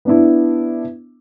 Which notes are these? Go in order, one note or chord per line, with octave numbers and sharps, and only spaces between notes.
B3 D4 E4